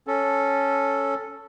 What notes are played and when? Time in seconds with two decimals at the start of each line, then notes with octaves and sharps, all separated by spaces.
0.07 C#4 A4